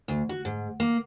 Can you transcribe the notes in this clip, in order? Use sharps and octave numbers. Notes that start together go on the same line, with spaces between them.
D2
F#4
G#2
A#3